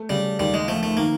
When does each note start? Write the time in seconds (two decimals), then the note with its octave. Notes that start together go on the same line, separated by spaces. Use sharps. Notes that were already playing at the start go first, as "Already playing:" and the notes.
Already playing: A3
0.10 C#3 G3
0.39 D#2 G3
0.54 G#3
0.68 F3 A3
0.83 A3
0.97 D#3 A#3